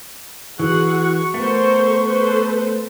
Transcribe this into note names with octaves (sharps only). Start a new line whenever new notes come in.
E3 F#4 G#4 F#5 C#6
A3 B3 A4 A#4 C5
A4 B4 C5